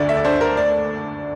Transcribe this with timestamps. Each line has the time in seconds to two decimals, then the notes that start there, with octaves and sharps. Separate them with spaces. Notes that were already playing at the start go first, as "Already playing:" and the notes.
Already playing: D2 D3 A3 D5
0.09 E5
0.17 D5
0.25 D4 C5
0.41 A#4
0.57 D5